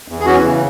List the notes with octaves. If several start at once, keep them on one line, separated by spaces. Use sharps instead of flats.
E2
G#4
E3 C#4 F#4
C#3